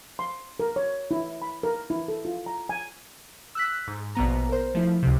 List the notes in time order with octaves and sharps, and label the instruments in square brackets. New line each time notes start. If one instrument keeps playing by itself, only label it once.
[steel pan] C6
A#4
C#5
E4
B5
A#4
E4
A4
F4
A#5
G#5
[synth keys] E6 F#6 B6
G#2
A#1 B2 B3 A#5
A#4 C5
F3 A3 E4
C#2 C3